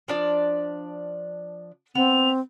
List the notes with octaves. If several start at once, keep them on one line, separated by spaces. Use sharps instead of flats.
F3 D4 D5
B3 C4 F7